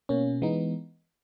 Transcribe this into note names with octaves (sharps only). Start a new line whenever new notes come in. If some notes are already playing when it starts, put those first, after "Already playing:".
B2 A#3 C#4
E3 G#3 B3 D#4